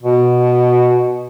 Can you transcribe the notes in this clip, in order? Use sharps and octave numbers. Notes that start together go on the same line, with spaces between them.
B2